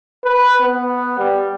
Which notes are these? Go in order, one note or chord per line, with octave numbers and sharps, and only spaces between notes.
B4
B3
G3